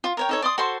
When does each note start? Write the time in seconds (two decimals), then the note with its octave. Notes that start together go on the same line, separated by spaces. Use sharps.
0.04 F4
0.17 A#4 C#5 G5
0.29 D#4 A4 C#5
0.42 D5 C6 D#6
0.58 F#4 A4 C5 C6